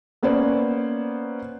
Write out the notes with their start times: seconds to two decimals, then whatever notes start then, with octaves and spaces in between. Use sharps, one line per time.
0.23 A#3 B3 C#4 C5 D5